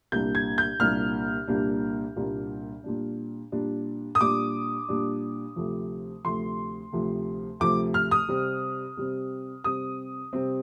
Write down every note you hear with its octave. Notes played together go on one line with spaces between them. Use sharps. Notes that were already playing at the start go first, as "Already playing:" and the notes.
C2 A#2 G3 A#3 D4 G6
G#6
G6
C2 A#2 G3 A#3 D4 F6
C2 A#2 G3 A#3 D4
C2 A#2 G3 A#3 D4
A#2 G3 D4
A#2 G3 D4
D#6
A#2 G3 D4 D6
A#2 G3 D4
D2 C3 F3
D2 C3 F3 C6
D2 C3 F3
D2 C3 F3 D6
F6
D#6
C3 G3 C4
C3 G3 C4
C3 G3 C4 D#6
C3 G3 C4